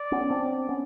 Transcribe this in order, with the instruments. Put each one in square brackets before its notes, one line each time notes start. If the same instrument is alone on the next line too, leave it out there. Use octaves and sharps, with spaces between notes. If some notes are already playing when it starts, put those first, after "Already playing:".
Already playing: [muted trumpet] D5
[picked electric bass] B3 C#4
C4 D4
B3 C#4